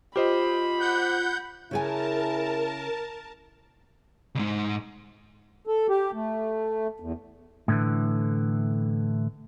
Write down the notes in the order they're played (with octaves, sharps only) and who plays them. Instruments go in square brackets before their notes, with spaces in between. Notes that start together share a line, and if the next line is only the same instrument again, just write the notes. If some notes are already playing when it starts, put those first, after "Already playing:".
[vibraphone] F4 [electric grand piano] G4 C5 D#5 [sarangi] B5
[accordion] F#5 G6
[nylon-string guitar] C#3 G#4 G#5 [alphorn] E4 [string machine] A#4 A5
[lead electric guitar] C#2 G#2
[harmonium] A4
G4
A3
E2
[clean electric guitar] A2 D3 E3